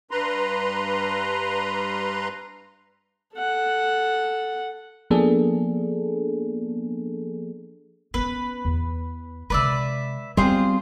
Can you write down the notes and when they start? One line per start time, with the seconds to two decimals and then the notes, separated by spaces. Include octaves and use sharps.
0.11 G2 B4 A#5 C6
3.35 A4 F#5
5.10 F3 A#3 B3 D4 G#4 A4
8.14 B3 C#4 B4
8.65 E2
9.50 C3 G#3 B4 D5 E5
10.37 G3 G#3 B3 C4 D#4 F4 G#4 C5